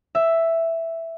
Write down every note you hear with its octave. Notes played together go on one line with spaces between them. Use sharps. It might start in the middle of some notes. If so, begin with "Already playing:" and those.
E5